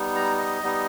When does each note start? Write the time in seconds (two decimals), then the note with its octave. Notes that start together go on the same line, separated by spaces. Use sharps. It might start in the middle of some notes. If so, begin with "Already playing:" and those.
Already playing: G3 B3 D#4
0.15 A#5
0.38 D#5
0.63 G3 B3 D#4